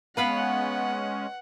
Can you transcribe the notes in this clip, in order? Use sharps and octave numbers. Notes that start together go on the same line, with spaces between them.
G#3 B3 C#4 B4 F5 F#5 B5